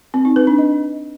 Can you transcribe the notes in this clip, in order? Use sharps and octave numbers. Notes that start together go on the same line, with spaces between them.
C4
D#4
B4
D4
D#5